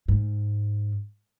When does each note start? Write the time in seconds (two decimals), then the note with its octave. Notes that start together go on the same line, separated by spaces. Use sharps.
0.08 G#2